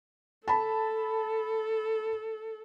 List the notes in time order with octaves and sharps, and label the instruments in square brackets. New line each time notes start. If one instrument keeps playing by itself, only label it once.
[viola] A4 [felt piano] A5 B5